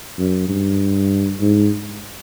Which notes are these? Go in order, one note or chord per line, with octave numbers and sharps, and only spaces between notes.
F#2
G2
G#2